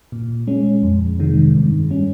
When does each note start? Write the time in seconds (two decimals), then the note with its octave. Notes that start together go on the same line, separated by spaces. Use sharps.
0.12 A#2
0.47 G#3 C#4
0.83 F2
1.19 C3 D#3 G#3
1.55 G2
1.91 G3 C#4